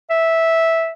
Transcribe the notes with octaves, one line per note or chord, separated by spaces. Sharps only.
E5